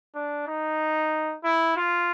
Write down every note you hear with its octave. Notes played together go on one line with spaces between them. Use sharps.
D4
D#4
E4
F4